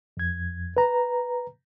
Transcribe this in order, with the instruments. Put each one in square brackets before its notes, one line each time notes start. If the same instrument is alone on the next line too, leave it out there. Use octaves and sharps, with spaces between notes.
[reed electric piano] F2 G#6
B4 A#5